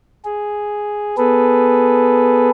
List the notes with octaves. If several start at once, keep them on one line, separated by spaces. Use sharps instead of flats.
G#4
B3 G#4 A4 B4